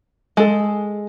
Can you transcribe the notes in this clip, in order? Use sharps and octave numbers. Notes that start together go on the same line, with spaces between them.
G#3 A4